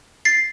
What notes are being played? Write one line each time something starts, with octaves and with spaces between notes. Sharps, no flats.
A6 C7